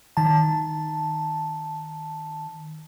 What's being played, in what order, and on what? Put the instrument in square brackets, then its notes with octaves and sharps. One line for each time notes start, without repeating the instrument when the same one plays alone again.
[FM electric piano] D#3 A5